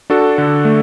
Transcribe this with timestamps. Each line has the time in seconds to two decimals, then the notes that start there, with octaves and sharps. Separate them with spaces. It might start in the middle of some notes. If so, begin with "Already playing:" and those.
0.10 D4 F#4 A4
0.38 D3
0.65 A3